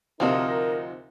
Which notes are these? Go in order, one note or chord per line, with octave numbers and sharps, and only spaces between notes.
D2 C3 F3 D#4 A#4 D#5